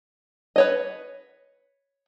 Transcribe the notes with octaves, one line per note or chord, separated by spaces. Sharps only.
B4 C#5 D#5